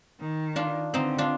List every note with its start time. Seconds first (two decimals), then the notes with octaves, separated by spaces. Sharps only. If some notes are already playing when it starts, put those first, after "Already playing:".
0.20 D#3
0.56 D4 F4
0.94 D3 C4 D#4
1.18 D4 F4